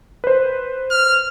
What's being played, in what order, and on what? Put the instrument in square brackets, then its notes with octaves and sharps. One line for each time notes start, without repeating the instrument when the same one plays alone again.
[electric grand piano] B4 C5
[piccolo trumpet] F6